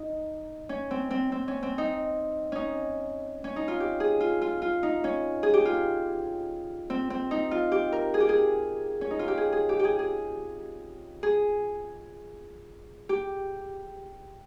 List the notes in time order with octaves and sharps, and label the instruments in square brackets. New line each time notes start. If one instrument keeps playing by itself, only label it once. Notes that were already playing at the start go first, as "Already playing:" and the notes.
Already playing: [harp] D#4
C#4
C4
C4
C4
C#4
C4
D#4
C#4 D#4
C#4
D#4
F4
G4
G#4
F4
F4
F4
D#4
C#4
G#4
G4
F4
C4
C4
D#4
F4
G4
A#4
G#4
G4
G#4
C#4
D#4
F4
G4
G#4
G#4
G4
G4 G#4
G#4
G#4
G4